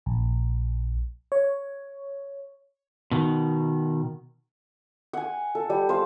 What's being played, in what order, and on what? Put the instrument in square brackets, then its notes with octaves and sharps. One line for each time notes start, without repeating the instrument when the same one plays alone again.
[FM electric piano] A#1
C#5
[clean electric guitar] B2 D#3
[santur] F#5 G#5
A4
G3
C5 F5